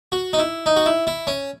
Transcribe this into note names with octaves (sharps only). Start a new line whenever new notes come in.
F#4
D#4
E4
D#4
F#4
E4
E4
C#4